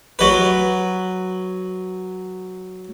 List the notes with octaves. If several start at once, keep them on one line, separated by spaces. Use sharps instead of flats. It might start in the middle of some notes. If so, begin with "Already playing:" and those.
F#3 B4